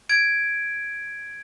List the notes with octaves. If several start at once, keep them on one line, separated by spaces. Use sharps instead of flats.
G#6 D7